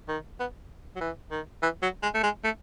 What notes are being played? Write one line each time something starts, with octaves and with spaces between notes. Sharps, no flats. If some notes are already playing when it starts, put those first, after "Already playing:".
D#3
B3
F#3
E3
D#3
E3
F#3
G#3
A3
G#3
A3